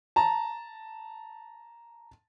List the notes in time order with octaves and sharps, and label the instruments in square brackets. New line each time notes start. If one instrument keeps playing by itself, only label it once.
[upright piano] A5 A#5